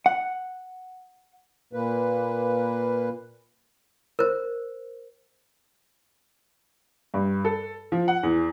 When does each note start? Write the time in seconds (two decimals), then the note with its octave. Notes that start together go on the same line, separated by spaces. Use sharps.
0.06 F#5
1.73 A#2 A#3 B4
4.19 A#4 C5
7.14 G2
7.45 A4
7.92 F3
8.08 F#5
8.23 E2